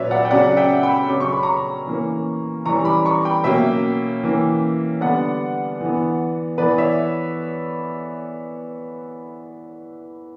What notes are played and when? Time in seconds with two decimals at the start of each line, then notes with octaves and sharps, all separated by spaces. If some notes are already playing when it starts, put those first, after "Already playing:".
Already playing: A#2 F#3 C#4 B4 C#5 D5 E5
0.11 D5 F#5
0.25 G5
0.31 C#3 F#3 C#4 D5 F#5
0.57 E5 G5
0.83 G5 B5
1.09 C#3 F#3 C#4 D6
1.20 C#6
1.32 B5
1.43 A#5 C#6
1.87 E3 A#3 C#4
2.65 E3 G3 C#4 A#5 C#6
2.85 B5 D6
3.05 A#5 C#6
3.25 G5 B5
3.44 B2 F#3 A#3 C#4 E5 G5
4.23 E3 A#3 C#4
5.01 D3 G3 B3 D5 F#5
5.81 E3 B3
6.58 E3 B3 B4 D5
6.78 C#5 E5